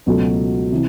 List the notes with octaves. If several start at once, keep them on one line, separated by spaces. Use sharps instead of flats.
C#2 B2 F#3 A3
C3 E3